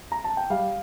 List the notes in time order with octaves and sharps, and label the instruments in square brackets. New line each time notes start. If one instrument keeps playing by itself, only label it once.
[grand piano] A#5
A5
G5
G3 F5